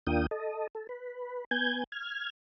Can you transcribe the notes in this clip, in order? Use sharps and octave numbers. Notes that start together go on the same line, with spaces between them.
D#2 A#3 D4 F4 G5 D#6
A4 D#5
A4
B4
B3 G#5 G6 G#6
F6 G#6